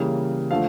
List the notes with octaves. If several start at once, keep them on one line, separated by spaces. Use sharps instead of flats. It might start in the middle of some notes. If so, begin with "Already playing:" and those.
Already playing: C#3 E3 G3 A#3
D3 F3 A3 F5